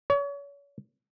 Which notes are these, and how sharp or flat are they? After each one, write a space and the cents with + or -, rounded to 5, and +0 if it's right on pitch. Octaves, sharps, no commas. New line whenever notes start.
C#5 +35